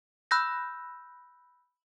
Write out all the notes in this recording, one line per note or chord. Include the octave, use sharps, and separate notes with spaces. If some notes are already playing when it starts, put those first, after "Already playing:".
B5 E6 F#6 G6 A#6